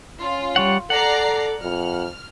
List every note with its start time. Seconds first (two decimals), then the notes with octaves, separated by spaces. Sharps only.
0.22 C#4 F4
0.56 G3 C#5 F#5
0.90 A4 D5 F#5 A#5 C7
1.61 F2 F6